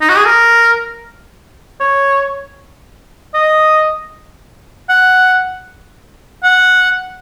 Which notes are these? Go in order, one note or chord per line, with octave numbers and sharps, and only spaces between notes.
D#4
F#4
G#4
A#4
C#5
D#5
F#5
F#5